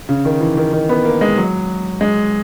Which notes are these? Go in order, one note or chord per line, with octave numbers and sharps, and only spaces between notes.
C#3
D#3
E3
D#3
D#3
B3
A#3
G#3
F#3
G#3